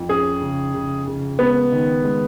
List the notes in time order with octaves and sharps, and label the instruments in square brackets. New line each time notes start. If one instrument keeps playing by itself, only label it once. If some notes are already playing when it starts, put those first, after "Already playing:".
Already playing: [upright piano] F2
[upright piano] C#4 [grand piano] G#4
[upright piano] C#3
C#3
C#3
[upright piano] G#3 [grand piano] B3
[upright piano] D#3
G#3